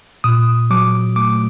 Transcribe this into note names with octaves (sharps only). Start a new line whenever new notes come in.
A#2 D#6
F#3 D6
A3 D6